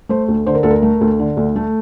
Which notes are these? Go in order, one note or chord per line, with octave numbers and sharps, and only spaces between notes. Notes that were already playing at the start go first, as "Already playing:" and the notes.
A3 C5
D2
D3 C5
A#4
D2 A4
A#4
A3
D2
D3
D2
A3